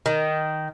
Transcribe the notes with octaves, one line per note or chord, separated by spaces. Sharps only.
D#3